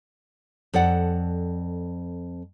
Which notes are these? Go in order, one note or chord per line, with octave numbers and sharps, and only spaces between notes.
F2 A4 D5 F#5